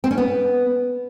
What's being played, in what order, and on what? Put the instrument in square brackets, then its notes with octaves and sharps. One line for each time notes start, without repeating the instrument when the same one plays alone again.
[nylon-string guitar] C4
C#4
B3